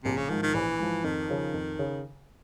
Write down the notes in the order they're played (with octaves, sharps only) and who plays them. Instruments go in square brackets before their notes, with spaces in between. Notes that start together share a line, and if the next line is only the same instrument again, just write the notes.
[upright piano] A#1 [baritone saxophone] C3
[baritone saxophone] C#3
[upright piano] G#2 F3 [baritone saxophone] D#3
[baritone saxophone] D#3
[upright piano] A#1 [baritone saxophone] E3
[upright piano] G#2 F3
[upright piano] F2 [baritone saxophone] D#3
[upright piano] C#3 F3
F2
C#3